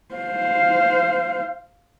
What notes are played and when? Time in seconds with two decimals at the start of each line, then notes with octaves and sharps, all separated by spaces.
0.15 C5 F5